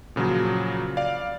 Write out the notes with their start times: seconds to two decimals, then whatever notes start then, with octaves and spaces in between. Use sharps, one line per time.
0.16 A#2 C#3 F3 F#3
0.97 D5 F5